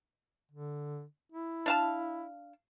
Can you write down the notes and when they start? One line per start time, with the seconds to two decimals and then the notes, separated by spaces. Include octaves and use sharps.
0.51 D3
1.32 E4
1.66 D4 F5 A5